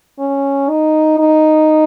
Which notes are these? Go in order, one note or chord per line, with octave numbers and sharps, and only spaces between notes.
C#4
D#4
D#4